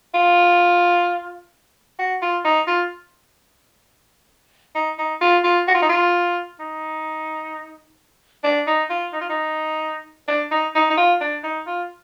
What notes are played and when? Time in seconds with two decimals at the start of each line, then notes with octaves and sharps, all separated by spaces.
0.14 F4
1.99 F#4
2.22 F4
2.45 D#4
2.67 F4
4.75 D#4
4.99 D#4
5.21 F4
5.44 F4
5.68 F#4
5.74 F4
5.82 D#4
5.89 F4
6.60 D#4
8.44 D4
8.67 D#4
8.90 F4
9.13 D#4
9.21 F4
9.29 D#4
10.28 D4
10.51 D#4
10.75 D#4
10.90 D#4
10.98 F4
11.21 D4
11.43 D#4
11.67 F4